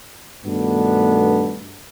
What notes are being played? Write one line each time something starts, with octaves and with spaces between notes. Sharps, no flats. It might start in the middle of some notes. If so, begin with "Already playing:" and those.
G2 B2 D#3 A3 B3 D4